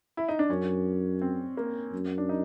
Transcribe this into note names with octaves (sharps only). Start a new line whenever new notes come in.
E4
D#4
D4
F#2 C#4
C4
A#3
F#2
D4
D#4